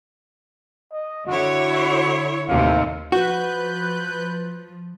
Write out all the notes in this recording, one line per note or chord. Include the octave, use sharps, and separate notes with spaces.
D#5
D3 E4 F#4 C#5
D#2 A2 C3 F5
F3 F#4 B4 F#6 G6